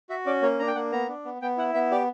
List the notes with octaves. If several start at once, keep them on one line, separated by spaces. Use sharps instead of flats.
F#4 E5
C#4 D5
A#3 C#5
D4 A#5
G5
A#3 F#5
B3 A#5
D4
B3
B3 G5
E4 F#5
B3 E5
G4 D5